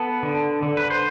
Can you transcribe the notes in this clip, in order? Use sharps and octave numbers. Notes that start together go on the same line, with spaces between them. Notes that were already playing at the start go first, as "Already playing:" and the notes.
Already playing: B3 A4 B4
D3
D3
B4
C5